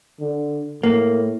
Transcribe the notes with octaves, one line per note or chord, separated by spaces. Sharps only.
D3
A2 A#3